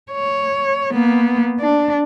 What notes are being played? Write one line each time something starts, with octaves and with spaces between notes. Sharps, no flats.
C#5
A#3 B3
D4